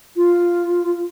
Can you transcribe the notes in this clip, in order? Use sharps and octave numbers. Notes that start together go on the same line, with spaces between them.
F4